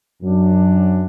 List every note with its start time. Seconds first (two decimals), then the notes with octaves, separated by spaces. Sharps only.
0.22 F#2 F#3 D4